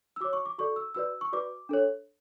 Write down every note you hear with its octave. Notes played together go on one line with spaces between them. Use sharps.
E6
F#4 C#5 D6
C#6
D6
F#4 A4 D5 C#6
E6
F#4 B4 D5 E6
C#6
F#4 B4 D5 D6
D4 A4 C#5